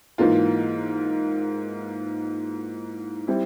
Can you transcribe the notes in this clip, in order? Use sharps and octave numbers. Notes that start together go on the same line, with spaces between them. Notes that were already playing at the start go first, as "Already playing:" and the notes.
G#2 E3 A#3 F4
G3 C4 E4